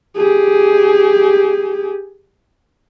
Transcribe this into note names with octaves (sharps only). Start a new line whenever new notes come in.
G4 G#4